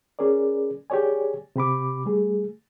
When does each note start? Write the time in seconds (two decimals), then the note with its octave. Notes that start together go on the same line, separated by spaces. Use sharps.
0.19 C#4 G#4 A#4 D5
0.90 G4 G#4 C#5 D5 G#5
1.56 C3 G4 B5 D6
2.06 G3 A3 G#4